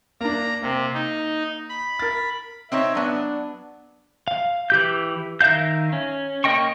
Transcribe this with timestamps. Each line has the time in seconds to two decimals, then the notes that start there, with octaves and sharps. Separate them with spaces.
0.21 A#3 D4 A#5
0.62 C3 A#3
0.94 D#4
1.69 B5
1.99 A#4 A6
2.72 C4 D#4 C#5 E5
2.95 F#3 B3 D4
4.28 F5
4.70 E3 G4 G6
5.41 D#3 A#4 E5 F5 G6
5.93 C#4
6.44 A#3 A#4 D#5 G5 C#6